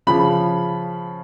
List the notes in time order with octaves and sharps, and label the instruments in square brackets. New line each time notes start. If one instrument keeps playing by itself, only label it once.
[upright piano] C#3 F3 B5